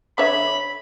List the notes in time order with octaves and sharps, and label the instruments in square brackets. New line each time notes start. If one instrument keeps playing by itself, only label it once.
[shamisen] D3 C#5 E5 [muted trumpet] B5